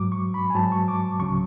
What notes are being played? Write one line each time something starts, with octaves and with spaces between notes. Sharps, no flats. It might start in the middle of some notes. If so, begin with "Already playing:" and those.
Already playing: G#2 F#3 D6
C#6
B5
G#5
G#2 F#3 A5
C#6
D6
C#2 C#3 F#3 C#6